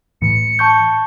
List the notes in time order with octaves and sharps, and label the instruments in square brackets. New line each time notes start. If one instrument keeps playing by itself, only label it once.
[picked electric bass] A2 E3 [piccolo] C#7
[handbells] A5 C#6 G6